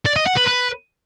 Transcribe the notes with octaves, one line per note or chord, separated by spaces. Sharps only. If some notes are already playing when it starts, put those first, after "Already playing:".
D5
D#5
F#5
B4
B4